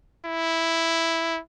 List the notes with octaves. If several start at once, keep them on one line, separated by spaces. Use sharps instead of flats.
E4